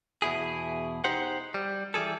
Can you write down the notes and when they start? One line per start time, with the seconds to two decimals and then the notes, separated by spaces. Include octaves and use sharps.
0.22 E2 B2 E4 G#4
1.04 D#4 G4 C5 F#5
1.54 G3
1.94 E3 G3 G#4 A4